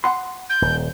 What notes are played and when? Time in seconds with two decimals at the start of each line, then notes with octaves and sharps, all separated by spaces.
0.04 F#5 C6
0.49 G6
0.62 D#1